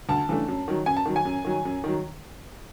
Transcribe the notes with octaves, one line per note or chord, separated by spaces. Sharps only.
D2 A5
C#3 E3 A3 D4
F#2
D#3 F#3
F#2 G#5
A5
D#3 F#3
G#5
F#2
D#3 F#3
F#2
D#3 F#3